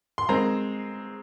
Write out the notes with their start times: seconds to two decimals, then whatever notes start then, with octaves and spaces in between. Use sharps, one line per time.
0.18 C6
0.29 D#3 G#3 C4 A#5